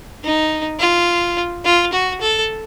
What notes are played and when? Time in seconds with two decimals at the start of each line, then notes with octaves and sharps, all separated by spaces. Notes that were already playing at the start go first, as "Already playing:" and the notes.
0.24 D#4
0.80 F4
1.65 F4
1.93 F#4
2.21 A4